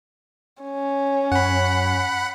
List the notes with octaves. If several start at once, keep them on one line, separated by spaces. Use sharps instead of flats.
C#4
F#2 F#5 B5